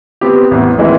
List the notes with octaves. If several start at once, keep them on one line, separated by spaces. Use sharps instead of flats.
B3 C4 G4
A1 E2
D#3 E3 G#3 A#3 C4